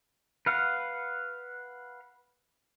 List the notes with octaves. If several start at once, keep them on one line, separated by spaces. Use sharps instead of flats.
B4 F5 F#5